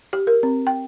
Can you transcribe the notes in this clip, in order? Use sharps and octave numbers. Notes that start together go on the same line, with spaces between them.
G4
A#4
C4
G5